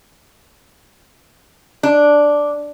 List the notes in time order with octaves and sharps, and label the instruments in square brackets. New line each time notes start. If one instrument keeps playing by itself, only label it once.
[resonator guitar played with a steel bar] D4